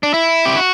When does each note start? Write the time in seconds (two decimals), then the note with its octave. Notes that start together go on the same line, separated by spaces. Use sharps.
0.03 D4
0.14 E4
0.45 G4
0.57 F#4